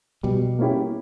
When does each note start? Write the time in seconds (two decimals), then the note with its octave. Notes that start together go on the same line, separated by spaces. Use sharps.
0.23 B2 G3
0.59 A#3 C#4 E4 G4